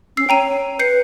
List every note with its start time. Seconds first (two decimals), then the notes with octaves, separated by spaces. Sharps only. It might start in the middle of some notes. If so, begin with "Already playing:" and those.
0.17 C#4 E6 C7
0.29 C#5 G5 A#5 D#7
0.79 B4 G6 C7 C#7